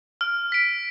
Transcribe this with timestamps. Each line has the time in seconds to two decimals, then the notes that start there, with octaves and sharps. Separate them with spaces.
0.21 F6
0.52 B6 D7